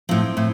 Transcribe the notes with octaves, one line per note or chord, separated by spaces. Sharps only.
A2 F3 C4
A2